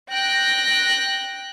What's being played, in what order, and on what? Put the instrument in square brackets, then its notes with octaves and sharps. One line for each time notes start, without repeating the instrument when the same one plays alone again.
[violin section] G5 F#6 A#6